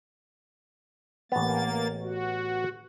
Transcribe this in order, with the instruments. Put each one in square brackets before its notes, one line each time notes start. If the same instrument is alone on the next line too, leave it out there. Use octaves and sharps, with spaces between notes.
[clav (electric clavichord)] A1 B3 [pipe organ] A#3 A6
[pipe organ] F#4